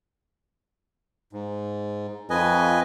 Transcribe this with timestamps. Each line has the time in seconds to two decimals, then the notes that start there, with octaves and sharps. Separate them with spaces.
1.33 G#2
2.30 F2 B4 D#5 G#5